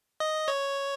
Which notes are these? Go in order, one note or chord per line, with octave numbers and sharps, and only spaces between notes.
D#5
C#5